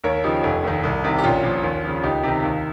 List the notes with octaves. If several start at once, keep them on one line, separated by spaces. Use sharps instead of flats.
D#2 A#4 C#5
C#3 F3 D#4 G4
F1
D#2 D#3
C2
C3 D#3
G4
A#1 C#4 F4
A#2 F3
D#2
C#3 F3
C#2 D#4 G4
C3 D#3
D#2